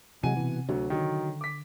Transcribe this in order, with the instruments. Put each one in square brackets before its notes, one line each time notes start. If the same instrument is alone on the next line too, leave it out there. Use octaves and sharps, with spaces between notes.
[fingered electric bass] C3 [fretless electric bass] E3 F#3 G#3 [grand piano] F#5 G#5 D#7
[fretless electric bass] B2 E3
[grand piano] D2 F#3 [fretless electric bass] D3
[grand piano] D#3 F#3
D6 B6